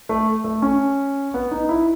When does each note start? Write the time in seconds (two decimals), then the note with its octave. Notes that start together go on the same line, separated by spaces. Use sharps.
0.09 A3
0.44 A3
0.62 C#4
1.34 B3
1.51 D#4
1.69 E4